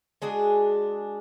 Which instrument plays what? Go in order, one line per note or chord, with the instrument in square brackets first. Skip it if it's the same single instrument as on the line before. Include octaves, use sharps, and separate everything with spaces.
[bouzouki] G#3 D4 F#4 G#4